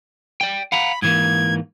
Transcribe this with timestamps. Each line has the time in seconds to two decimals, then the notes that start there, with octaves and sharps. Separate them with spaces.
0.41 D5 G5
0.72 F5 F#5 A#5 B5
1.02 G#2 E3 A#3 G#6